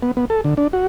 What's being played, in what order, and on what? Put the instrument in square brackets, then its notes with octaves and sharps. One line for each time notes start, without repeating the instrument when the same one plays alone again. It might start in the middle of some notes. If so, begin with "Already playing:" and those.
[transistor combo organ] B3
B3
A4
D3
D4
F#4